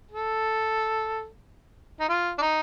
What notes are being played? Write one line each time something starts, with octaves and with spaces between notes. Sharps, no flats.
A4
D#4
F4
D4
D#4